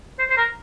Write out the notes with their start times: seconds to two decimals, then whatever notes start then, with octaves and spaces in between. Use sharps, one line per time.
0.19 C5
0.30 C5
0.37 A#4